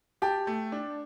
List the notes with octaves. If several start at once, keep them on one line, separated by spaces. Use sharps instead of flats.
G4 G5 A5
A3
D4